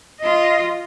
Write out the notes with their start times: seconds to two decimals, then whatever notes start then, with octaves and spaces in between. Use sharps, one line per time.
0.20 F4 D#5